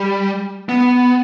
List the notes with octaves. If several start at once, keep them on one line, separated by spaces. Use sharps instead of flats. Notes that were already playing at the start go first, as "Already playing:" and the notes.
Already playing: G3
B3